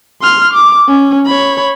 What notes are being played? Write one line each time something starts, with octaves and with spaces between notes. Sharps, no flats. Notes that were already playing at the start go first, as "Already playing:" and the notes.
C6 F6
D6
C#4
C#5 B5